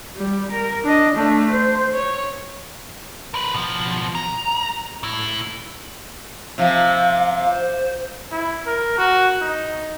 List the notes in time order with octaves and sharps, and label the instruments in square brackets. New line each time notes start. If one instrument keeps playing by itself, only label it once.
[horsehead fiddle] G3
A#4
D4 D#5
A3 D4
C5
C#5
[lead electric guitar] A#4 B4
B2 F3
A#5
A2 E4
[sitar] C3 F3 [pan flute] F5
[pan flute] C5
[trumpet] E4
A#4
F#4
D#4